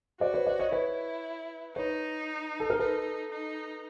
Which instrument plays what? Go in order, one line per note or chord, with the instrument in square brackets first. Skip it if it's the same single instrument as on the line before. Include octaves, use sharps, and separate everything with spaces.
[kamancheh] F#4 [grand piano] C5 D5
[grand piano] B4 C#5
C5 D5
C#5 D#5
[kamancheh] E4 [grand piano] B4 C#5
[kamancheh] D#4 [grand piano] B4 C#5
[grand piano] A4
A#4
[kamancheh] D#4 [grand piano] A4 B4
[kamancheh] D#4